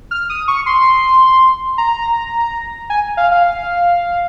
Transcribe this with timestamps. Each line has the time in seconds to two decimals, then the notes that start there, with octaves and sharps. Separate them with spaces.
0.11 F6
0.30 D#6
0.48 C#6
0.66 C6
1.78 A#5
2.90 G#5
3.17 F5
3.31 F5